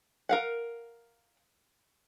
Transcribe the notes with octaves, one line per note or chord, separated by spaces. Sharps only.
A#4 F5 F#5